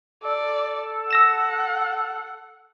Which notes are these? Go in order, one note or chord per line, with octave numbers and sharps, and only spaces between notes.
A4 D5
F#5 E6 A#6 E7